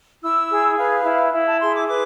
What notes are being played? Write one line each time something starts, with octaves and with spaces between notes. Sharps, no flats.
E4 E6
G#4
B4 F5
E4
E4
A5
G#4 C6
D6
B4 D6